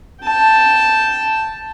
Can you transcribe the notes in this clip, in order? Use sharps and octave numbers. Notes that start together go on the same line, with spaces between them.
G5 A5